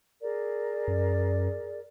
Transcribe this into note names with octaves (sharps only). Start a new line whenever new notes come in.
G#4 A#4 D5
F#2